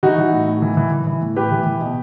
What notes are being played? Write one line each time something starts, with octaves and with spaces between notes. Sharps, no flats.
E3 D#4 F#4
E3
A2
A2
E3
E3
E3
E3
A2
A2 G4 B4
E3
E3
B2